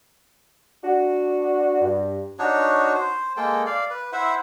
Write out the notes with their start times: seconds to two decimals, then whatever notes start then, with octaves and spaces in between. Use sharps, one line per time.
0.84 D4 F#4
1.81 G2
2.39 D4 D#4 F#4 C#5
2.94 C5
3.37 G#3 A#3 A4 G5
3.66 D5 F5
3.90 B4
4.12 E4 C5 E5 F#5